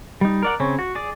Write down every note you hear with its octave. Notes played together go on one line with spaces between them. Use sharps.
G3 D#4
A#4 D5 F#5
C#3 C4 C#4
F#4
G#4 D5